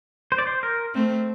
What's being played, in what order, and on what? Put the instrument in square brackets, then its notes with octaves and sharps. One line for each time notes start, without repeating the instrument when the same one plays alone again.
[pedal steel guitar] C5
D5
C5
A#4
[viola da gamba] A3 C4